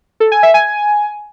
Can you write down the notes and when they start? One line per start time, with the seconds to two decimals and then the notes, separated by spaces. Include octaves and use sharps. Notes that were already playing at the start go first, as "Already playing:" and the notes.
0.20 A4
0.32 G#5
0.43 E5
0.54 G#5